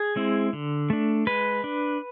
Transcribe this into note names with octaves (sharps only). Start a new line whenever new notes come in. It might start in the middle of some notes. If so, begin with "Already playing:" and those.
Already playing: G#4
G#3 C4 E4
D3
A3 D4
G#3 B4
D4